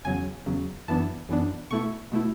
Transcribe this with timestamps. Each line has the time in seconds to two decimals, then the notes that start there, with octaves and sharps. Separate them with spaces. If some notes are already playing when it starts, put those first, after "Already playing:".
0.05 E2 C#3 F#3 G#5
0.46 E2 C#3 F#3
0.88 F#2 E3 B3 D4 A5
1.29 F#2 E3 B3 D4
1.71 B2 A3 E4 C#6
2.12 B2 A3 E4